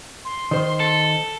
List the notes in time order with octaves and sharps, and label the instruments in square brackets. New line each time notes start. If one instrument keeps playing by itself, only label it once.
[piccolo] C6
[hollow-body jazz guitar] D#3 C5
[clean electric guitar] A4